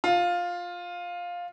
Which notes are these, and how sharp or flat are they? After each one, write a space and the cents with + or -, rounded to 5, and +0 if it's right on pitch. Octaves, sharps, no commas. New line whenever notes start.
F4 +10